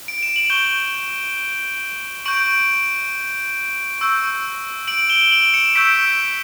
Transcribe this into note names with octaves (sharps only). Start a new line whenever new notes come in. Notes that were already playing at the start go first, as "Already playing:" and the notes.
D7
E7
F#7
C#6 G6 E7 G7
C#6 G6 D7 F#7
C#6 E6 G6
D7 F#7
E7 G7
G7
D7 F#7
C#7 E7
C#6 E6 G6 B6 D7